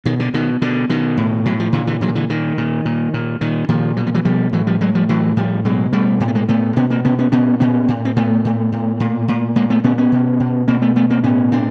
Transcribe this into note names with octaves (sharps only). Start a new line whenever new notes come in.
B2 D#3
D3
B2 D#3
B2 D3
B2 D#3
A2
A2 F#3
F3
A#2 D3 E3
D3 E3
A#2 E3 F#3
D#3
D3 E3
A#2 D#3
A#2
A#2
A#2
A#2 D#3
A#2 D#3 F3
B2 F#3
F3
E3 F#3
B2 F3 G3
A2 E3 F#3
F3 G3
A2 F#3 G#3
F3 G3
A2 E3 F#3
A2 F3 G3
B2 F#3 G#3
B2 G3 A3
A2 A#3
B3
G#3 A#3
A2 A3 B3
B2 B3 C#4
A#3 C4
B2 B3 C#4
B3 C#4
A#2 B3 C#4
A#2 B3 C#4
A2
C4
A2 A3 B3
A2
A2
A#2
A#2
A#2 G#3 A#3
A3 B3
A#2 B3 C#4
B3 C#4
B2
B2
B2 A#3 C4
A3 B3
B2 A3 B3
A#3 C4
A2 B3 C#4
A2 C4 D4